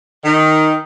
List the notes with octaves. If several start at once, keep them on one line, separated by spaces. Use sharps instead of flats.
D#3